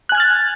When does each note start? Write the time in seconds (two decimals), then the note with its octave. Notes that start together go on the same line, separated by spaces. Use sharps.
0.09 F#6
0.12 G#5
0.15 G#6
0.17 F6
0.20 A6